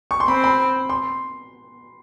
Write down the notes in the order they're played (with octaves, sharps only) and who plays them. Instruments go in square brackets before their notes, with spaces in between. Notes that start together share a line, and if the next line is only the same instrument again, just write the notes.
[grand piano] C#6
C6
[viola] C4 [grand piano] B5
[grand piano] B5
C6